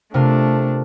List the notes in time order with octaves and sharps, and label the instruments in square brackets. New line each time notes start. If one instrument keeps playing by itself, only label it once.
[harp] C3 F4 A#4 [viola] A3 D4